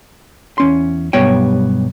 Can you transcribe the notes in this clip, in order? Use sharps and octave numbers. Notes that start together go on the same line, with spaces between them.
E2 C#4 C6
B1 G2 G3 B3 C#5 G5